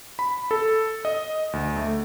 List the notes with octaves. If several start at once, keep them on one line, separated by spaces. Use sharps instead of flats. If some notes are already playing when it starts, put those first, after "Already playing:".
B5
A4
D#5
D2
A3